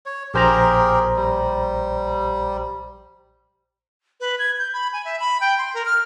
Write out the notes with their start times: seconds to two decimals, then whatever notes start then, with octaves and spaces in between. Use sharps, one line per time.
0.06 C#5
0.34 A#1 G4 G#4 A#4 C5 A#5
1.16 G3
4.20 B4
4.39 G#6
4.59 G6
4.74 B5
4.93 G#5
5.05 E5
5.20 B5
5.41 G5
5.58 C6
5.74 A#4
5.86 F6